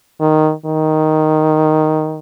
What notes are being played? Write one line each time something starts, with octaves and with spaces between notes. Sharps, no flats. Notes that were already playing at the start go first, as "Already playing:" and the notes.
D#3
D#3